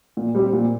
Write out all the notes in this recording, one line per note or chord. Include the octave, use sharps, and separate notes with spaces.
A#2
G3 C4 G4
A#2